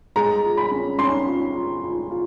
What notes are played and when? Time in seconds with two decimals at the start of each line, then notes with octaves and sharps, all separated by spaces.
0.16 G#3 A#5
0.44 F4
0.57 B5
0.72 C#4
0.99 C#4 C6
1.26 F4
1.54 F4
1.82 F4
2.10 F4